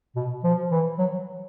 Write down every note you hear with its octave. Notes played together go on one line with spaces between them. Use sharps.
B2
F3
E3
F#3